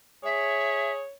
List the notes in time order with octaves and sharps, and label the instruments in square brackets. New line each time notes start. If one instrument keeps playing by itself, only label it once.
[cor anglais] G#4 [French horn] C#5 [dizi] E5